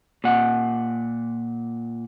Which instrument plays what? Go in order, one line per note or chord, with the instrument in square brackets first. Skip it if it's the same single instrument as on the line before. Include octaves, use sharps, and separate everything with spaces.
[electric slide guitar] A#2 F#5